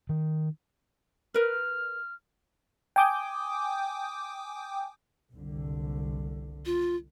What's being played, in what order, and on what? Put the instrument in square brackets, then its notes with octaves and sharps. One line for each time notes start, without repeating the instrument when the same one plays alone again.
[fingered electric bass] D#3
[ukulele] A#4 B4 [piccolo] F6
[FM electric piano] G5 G#5 D6 D#6 G6
[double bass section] F#1 C2 D3
[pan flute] F4